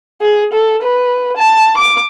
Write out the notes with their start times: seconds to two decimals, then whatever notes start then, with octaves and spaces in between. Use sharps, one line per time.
0.22 G#4
0.53 A4
0.82 B4
1.36 A5
1.77 D6